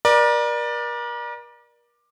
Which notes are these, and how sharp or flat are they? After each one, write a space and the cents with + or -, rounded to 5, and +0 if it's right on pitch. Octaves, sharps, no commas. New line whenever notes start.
A#4 +40 D5 +15